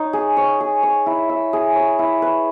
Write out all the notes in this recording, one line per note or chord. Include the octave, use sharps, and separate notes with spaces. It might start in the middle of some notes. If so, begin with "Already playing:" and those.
Already playing: D#4 C#5
G#4
C#5
G#4
C#5
E4
E5
G#4
C#5
E4
B4